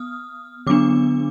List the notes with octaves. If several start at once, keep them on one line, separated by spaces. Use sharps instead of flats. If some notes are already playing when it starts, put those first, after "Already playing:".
Already playing: B3 D#6 F6
D3 F#3 B3 D4 D6